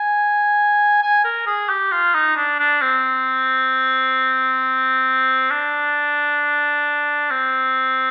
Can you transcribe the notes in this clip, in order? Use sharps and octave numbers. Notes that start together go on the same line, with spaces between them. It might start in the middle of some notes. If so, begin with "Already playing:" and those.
Already playing: G#5
G#5
A#4
G#4
G4
F4
D#4
D4
D4
C4
D4
C4